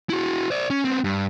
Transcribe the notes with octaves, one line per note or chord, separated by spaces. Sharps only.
E4 F#4
C5 D5
C#4
B3 C4
G2